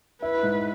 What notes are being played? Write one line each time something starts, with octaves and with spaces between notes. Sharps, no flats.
E4 B4
G#2